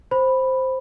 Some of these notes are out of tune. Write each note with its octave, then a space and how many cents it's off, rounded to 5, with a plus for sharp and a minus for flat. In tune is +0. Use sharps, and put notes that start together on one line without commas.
C5 +0 B5 +0